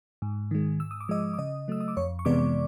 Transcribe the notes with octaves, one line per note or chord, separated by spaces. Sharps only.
G#2
D#3 G#3
G#2 E6
D#6
D6
F3 G#3 D#5 D#6
D6
C#3 D#5 D#6
F#3 A3 E6
D#6
D6
F2 C#5 C#6
C#6
C3 E3 G#3 B3 D5 D6